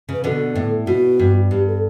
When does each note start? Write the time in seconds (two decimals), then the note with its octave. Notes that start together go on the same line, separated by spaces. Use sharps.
0.09 C#3 B4
0.24 B2 D3 A4
0.55 A2
0.87 B2 F#4
1.19 G2
1.51 G2 G4
1.67 A4